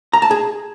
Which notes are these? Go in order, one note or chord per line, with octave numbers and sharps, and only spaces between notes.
A#5
A5
G#4